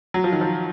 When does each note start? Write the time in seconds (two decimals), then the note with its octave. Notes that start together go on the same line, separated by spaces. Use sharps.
0.14 F#3
0.24 F3
0.32 D#3
0.41 F3